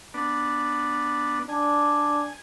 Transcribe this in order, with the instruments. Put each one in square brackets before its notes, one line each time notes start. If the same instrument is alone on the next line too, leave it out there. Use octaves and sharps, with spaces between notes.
[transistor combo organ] B3 D4
[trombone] D4 [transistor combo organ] G#5